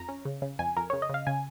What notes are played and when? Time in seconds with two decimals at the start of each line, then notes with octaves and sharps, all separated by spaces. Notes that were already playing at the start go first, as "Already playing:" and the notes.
Already playing: F2 A#5
0.08 C#4
0.25 C#3
0.42 C#3
0.59 F2 G#5
0.77 F2 A#4
0.90 C#3 C#5
1.02 D#5
1.09 C#3 F5
1.27 C#3 G#5